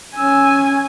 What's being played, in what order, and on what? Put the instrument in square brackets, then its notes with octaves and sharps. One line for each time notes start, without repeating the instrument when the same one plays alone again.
[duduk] C#4 [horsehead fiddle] G#5 [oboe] E6